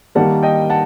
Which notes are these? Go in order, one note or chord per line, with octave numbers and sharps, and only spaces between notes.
D#3 G3 A#3 F#5 A5
D#5 G5
F#5 A5